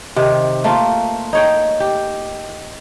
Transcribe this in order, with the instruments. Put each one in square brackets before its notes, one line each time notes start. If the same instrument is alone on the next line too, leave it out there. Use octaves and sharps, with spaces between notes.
[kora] C3 D#3
A3 A#3 F4
D#4 C#5 G5
G4